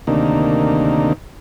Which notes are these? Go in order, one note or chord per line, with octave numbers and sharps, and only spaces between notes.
D2 C3 D#3 A#3 D4 D#4